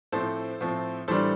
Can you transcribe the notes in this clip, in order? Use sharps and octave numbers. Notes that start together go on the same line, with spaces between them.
A2 F3 C4 A4 C5
A2 F3 C4
A2 E3 G3 D4 A4 C5